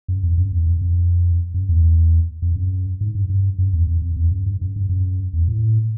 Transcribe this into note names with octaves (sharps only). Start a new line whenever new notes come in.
F#2
F2
F#2
E2
F2
F2
F#2
E2
F2
F#2
G#2
G2
G2
F#2
E2
F2
F2
E2
F#2
G2
F#2
G2
F#2
E2
A2